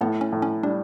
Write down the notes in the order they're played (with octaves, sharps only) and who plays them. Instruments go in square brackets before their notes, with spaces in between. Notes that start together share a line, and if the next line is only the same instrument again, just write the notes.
[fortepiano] A2 [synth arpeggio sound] B3
[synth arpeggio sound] C#4
[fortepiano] A2
[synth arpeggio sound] C#4
[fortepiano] G3 [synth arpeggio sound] D4